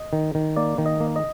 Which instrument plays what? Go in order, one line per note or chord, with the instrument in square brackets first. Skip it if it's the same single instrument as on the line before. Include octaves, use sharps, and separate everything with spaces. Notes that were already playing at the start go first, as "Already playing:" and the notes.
Already playing: [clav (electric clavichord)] D#5
D#3
D#3
A#3 D5
D#3
D#5
A#3
D#5